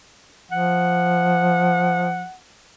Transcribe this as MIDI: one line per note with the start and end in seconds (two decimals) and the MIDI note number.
0.51 2.24 53
0.51 2.36 78